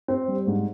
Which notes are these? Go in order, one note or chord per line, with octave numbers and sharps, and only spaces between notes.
C4
G3
G#2